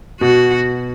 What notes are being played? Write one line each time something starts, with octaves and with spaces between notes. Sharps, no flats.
B2 F#4